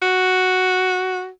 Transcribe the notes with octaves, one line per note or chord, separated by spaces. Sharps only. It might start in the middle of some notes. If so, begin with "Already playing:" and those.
F#4